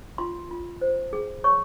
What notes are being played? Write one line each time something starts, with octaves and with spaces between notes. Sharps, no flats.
F4 C6
F4
C5
G#4
C#5 C#6